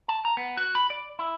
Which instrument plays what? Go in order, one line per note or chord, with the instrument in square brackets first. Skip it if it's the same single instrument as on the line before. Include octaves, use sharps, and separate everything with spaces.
[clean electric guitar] A5
A#5
B3
F#4
B5
D5
E4